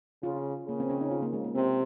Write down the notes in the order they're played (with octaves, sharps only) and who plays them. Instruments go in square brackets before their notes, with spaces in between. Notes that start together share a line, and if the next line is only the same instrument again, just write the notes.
[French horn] C#3 [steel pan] F4
[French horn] C#3 [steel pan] A#3
[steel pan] C4
C#4
D#4
F4
A#3
G#3
A#3
[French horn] C3 [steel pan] C4